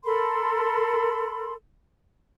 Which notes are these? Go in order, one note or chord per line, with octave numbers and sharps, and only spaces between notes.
A4 A#4 B5 C6